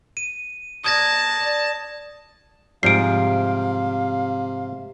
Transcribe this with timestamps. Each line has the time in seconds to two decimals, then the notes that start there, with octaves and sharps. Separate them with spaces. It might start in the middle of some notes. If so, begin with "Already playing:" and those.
0.17 D#7
0.84 A#3 D4 A5 D#6 G#6 A#6
1.41 D5
2.83 G#2 C3 F3 G3 F5 C7 D7